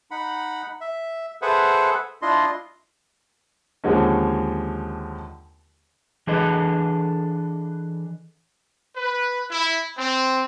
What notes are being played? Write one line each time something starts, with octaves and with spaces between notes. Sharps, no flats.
D#4 F#5 B5
E5
G#4 A4 B4 C5 E5 F#5
D4 E4 F4 D#5 C6
D#2 D3 F3 G#3 C#4
E3 D4 G#4 A4 B4 D#5
B4
E4
C4